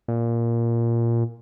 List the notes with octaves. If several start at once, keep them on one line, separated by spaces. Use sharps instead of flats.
A#2